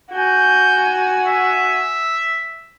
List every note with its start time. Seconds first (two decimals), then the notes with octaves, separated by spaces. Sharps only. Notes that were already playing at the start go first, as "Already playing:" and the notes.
0.12 F#4 G#5 G6
1.27 E5